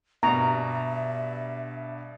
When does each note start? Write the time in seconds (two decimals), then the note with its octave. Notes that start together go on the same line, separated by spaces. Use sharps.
0.23 G2 B2 E5 A#5